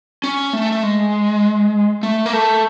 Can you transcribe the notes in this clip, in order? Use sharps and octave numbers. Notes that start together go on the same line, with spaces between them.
C#4
A3
A3
G#3
A3
A#3
A3